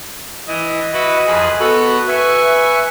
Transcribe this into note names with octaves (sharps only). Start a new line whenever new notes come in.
E3 D#5
E4 F#4 B4
F2 G#4 B4
B3 F#4 A4 B4
B4 E5 G#5 C#6